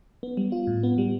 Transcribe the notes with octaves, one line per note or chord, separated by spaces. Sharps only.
B3
G3
F4
A2
B3
G3